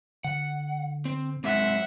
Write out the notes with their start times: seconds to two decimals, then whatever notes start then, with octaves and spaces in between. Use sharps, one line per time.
0.24 D3 F#5
1.05 C4
1.44 F#3 G#3 C4 E5 F#5